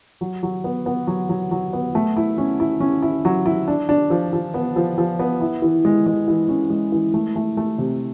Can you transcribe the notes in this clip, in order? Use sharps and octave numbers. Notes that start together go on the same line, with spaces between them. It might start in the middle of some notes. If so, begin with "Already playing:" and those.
F#3
F#3
B3
B3
F#3
F#3
F#3
B3
A3
E4
C#4
E4
C#4
E4
F#3
E4
D4
D4
F3
F3
B3
F3
F3
B3
E4
E3
G#3
G#3
E3
C#4
G#3
E3
A3
A3
A3
C3